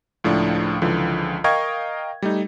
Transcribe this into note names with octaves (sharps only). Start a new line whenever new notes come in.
C#2 A2 F3 D4
C#2 D3 E3 F3
A#4 D#5 F5 G5 C#6 G#6
G3 A3 D#4